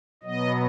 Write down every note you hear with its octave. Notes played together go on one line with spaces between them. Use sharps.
B2 F#3 B3 D#5